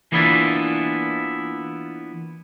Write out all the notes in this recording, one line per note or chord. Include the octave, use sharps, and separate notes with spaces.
E3 A#3 B3 D4 E4 F4